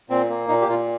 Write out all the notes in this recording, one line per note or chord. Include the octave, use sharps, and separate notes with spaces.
A#2 C4
A#3
A#2 D#4
G4
A#2 F4